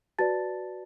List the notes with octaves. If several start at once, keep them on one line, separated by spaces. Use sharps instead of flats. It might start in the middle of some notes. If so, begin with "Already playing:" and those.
F#4 B4 D5 A5 A6